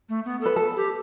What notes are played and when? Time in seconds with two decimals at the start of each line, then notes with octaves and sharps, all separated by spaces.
0.09 A3
0.25 B3
0.41 A4 B4
0.56 A4
0.77 G4